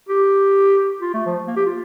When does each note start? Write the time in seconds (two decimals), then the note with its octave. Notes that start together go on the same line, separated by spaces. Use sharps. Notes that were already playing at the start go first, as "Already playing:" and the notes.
0.09 G4
1.01 F4
1.14 A3
1.26 F3
1.47 A#3
1.57 G4
1.66 F4